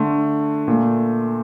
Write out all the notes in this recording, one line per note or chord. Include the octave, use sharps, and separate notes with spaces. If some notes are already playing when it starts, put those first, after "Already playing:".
Already playing: D3 A3 C6
A#2 A3